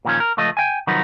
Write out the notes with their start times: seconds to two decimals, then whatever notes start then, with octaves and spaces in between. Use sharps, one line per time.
0.05 A#2 D#3 F3 C#4
0.20 A#4
0.37 C#2 F3 A3 D#5
0.57 G5 G#5
0.87 C2 D#3 F3 F#3 D#4 B4